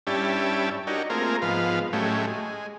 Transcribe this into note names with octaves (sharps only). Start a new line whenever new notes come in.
G2 C#4 E4 G4 D5 A5
D4 D#4 F#4 G4 A#4 C#5
A3 A#3 C4 F4 G#4 A#4
G#2 F3 B3 F5
A2 F#3 G#3 A3 C#4 G4
G#3